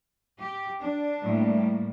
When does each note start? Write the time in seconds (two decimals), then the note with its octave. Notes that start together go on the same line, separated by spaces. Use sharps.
0.40 G4
0.81 D4
1.23 A2 G3 A#3